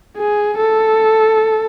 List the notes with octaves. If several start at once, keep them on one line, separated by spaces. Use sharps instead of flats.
G#4
A4